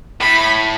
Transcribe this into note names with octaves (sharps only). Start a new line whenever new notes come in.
A2 B5